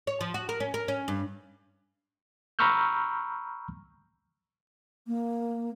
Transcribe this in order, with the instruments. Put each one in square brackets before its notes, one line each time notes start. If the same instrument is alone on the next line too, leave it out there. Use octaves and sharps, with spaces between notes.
[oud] C#5
F3
F#4
A#4
C#4
A#4
C#4
G2
[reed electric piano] A#5 B5 C#6 E6 F6 G6
[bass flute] A#3